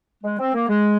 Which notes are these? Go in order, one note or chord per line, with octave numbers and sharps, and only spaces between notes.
G#3
C4
A#3
G#3